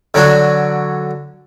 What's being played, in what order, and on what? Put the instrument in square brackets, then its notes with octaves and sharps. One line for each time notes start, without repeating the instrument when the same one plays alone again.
[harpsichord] D3 F#3 D4 F#4